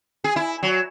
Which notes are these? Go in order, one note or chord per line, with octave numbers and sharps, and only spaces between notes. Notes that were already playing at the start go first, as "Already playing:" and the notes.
G#4
E4
F#3